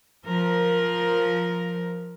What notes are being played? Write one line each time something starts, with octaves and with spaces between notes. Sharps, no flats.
F3 A#4